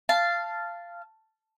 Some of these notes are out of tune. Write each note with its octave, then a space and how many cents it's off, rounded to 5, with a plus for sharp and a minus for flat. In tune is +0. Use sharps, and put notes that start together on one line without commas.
F5 -15 A5 +0